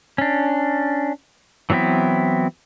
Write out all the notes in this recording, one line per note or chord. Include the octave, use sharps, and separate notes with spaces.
C#4 D4
E3 F#3 B3 C4 E4